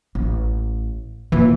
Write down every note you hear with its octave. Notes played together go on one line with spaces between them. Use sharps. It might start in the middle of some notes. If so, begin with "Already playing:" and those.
A1
D#2 A#2 E3